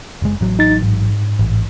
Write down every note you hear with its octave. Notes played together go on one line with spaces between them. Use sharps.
F#1 G#3
A1 F#3
D#4 A6
G#2
A1